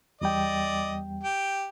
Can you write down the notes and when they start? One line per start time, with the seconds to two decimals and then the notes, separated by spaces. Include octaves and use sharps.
0.21 E2 G3 D5 D#5 G5
1.23 G4 G5